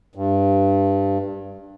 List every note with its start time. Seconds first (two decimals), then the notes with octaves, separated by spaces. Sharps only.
0.15 G2